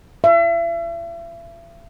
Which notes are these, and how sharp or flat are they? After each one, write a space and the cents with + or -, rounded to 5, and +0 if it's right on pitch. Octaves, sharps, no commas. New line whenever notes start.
E5 +40